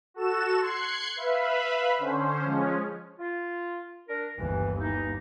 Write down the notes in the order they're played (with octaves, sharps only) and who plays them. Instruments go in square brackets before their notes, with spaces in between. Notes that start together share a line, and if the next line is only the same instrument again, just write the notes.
[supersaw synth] F#4 A4 E7
C6 F#6 G#6 C7 C#7
B4 E5 F5 B5
D3 C#4 C5
F3 G#3 C#4
[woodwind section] F4
D4 A#4
[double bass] G1 D#2 [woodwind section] E3
[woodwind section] E3 A#3 D#4